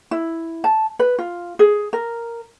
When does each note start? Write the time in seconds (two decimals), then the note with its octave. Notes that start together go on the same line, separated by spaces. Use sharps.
0.11 E4
0.64 A5
0.99 B4
1.19 F4
1.59 G#4
1.93 A#4